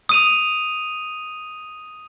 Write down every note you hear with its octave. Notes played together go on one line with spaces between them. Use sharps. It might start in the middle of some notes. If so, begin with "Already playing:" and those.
D#6 D#7 F7